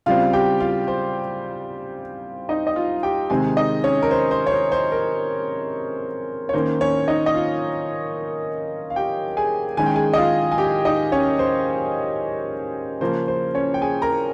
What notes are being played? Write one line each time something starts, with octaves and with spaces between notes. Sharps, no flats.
C#3 G3 C4 F4 F5
G4 G5
F4 F5
C5
D#4 D#5
D#5
F4 F5
G4 G5
C3 D#3 G#3 C4 G#4 G#5
D#4 D#5
C#4 C#5
A#4
C5
C5
C#5
C5
C5
A#4
C#5
D#3 A#3 C#4 C5
C#4 C#5
D#4 D#5
D#5
F4 F5
F5
G4 G5
G#4 G#5
D#3 G#3 C#4 G#5
G5
G#4 G#5
D#5
F4 F5
G#5
G4 G5
D#4 D#5
C#4 C#5
C5
C#3 F3 A#3 C#4 C5
C5
C#4 C#5
G5
G#4 G#5
A#4 A#5